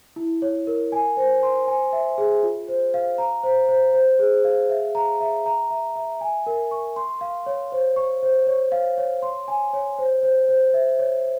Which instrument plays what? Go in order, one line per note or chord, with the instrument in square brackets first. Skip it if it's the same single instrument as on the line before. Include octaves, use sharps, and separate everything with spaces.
[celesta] E4
C#5
A#4
G#5
C5
C6
G#5
E5
G#4
F4
C5
F5
A#5
C5
C5
C5
G#4
F5
E5
A#5
E5
A#5
E5
E5
G#5
A#4
C#6
C6
F5
C#5
C5
C#6
C5
C#5
F5
C#5
C6
G#5
C#5
C5
C5
C5
E5
C#5